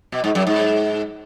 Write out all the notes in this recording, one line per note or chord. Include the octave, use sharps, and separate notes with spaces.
B2
G#2
F#2
G#2